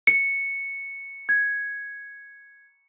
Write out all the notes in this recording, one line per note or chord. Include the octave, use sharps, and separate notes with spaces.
C#7
G#6